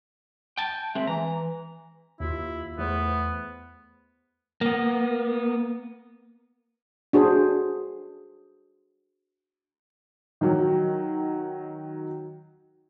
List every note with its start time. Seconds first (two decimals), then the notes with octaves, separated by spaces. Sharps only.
0.58 G5 A5
0.95 G#3 C4 E5
1.07 E3 A#5
2.20 D#2 E4 F4
2.78 E2 A3 B3 C5
4.61 A#3 B3
7.13 D4 F#4 G#4 C5
10.41 D#3 F#3